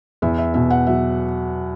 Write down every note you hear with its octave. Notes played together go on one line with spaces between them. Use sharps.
E2 E5
E5
B2 E5
F#5
F#3 E5